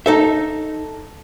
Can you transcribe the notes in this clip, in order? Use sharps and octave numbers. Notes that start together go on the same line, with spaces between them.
D#4 A4 E5